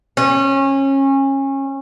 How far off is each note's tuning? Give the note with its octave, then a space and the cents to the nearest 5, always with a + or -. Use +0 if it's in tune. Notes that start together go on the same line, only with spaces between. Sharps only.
C#4 -25